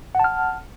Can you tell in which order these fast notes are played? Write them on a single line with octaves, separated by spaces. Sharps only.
F#5 A5 F6